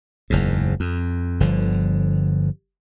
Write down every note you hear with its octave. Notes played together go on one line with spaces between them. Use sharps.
F#1 E2 G#2
F2
G1 D3 F3